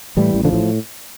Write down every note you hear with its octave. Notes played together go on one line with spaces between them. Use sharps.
A2 E3 G3
A1
D3 F3
A2